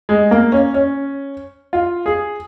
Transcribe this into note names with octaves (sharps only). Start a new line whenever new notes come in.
G#3
A#3
C#4
C#4
F4
G#4